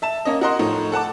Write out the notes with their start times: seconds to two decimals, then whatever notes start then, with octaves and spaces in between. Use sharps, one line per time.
0.02 E5 A5 E7
0.25 A#3 C#4 D#5
0.41 F#4 A#4 D#5 F#5 C6
0.59 A2 F3 D#4
0.92 A4 F#5 A5 D6